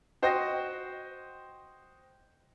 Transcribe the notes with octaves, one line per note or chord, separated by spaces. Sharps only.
F#4 C5 D#5 G5 A#6